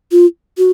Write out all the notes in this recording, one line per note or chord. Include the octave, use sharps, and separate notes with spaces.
F4
F#4